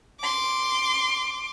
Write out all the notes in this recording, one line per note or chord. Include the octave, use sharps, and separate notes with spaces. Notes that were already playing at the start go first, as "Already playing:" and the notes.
C6 D6